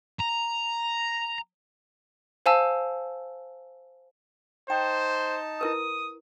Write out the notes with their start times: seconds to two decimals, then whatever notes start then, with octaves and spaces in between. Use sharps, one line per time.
0.20 A#5
2.46 C5 F5 G#5 A5 E6
4.70 D#4 C5 G5 A5
5.61 E4 A#4 B4 D#6